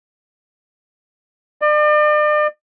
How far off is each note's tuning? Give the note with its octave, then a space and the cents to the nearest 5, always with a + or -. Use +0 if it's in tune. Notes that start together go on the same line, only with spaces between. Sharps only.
D5 +40